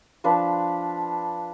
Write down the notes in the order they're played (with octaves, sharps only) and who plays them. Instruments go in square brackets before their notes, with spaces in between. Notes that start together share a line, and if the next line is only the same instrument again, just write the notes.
[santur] F3 D4 B4